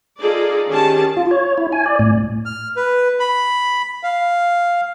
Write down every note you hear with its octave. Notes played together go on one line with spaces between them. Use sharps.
D#4 F4 G#4 A4 D5
D#3 C#4 G4 G#4 A5
F4
C#5
E4
G#5
D5
A2
F6
B4
B5
F5